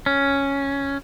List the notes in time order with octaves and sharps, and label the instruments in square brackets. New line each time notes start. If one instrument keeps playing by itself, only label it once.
[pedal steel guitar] C#4